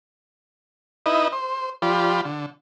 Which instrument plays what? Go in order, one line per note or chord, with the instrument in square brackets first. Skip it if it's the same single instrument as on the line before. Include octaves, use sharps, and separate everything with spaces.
[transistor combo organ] D#4 E4 B4 D#5
C5
F3 F4 G4 D5 B5
D3